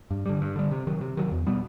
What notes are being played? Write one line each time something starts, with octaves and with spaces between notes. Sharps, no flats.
G2
D3 G3
G2
D3 G3
C3
D#3 F#3
C3
D#3 F#3
E2
B2 G3 B3